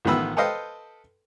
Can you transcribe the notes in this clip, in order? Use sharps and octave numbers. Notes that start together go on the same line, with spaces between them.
A1 D#3 F3 B3 B5 E6
A4 B4 C5 D#5 F5 G5